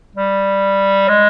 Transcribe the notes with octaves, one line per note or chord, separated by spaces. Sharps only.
G3
G#3